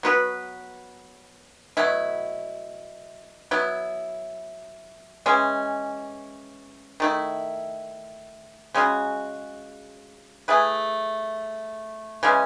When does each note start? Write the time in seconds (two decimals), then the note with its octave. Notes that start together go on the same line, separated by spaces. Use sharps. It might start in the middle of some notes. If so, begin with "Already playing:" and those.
0.03 F#3 B3 F#4 B4
1.77 B2 F#3 A3 E4
3.51 F#3 B3 E4
5.26 E3 G#3 C#4
7.00 D#3 A3 E4
8.74 C#3 G#3 C#4 F#4
10.48 A3 E4 G#4 B4
12.23 C#3 E3 G#3 C#4